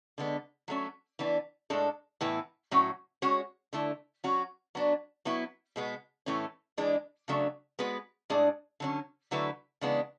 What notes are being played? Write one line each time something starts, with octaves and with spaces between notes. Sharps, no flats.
D3 G#3 B3
F#3 A3 C#4
E3 B3 D4
A2 G#3 D4 A4
A2 E3 B3 E4 B4
A2 F#3 C#4 F#4 C#5
G#3 C#4 F#4 C#5
D3 A3 E4
F#3 C#4 F#4
F#3 B3 D4
F#3 B3 E4
B2 G#3 B3
A2 E3 A3 C#4
E3 G#3 D4
C#3 F#3 A3 D4
G#3 B3 F#4 B4
A2 G#3 D4 G#4 D5
D3 F#3 C#4
D3 F#3 A3 E4 B4
C#3 E3 G#3 B3 D4